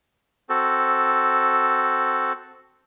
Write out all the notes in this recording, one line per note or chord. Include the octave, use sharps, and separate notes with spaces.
C4 F#4 A4